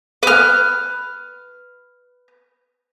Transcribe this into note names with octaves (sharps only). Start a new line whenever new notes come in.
B4 F6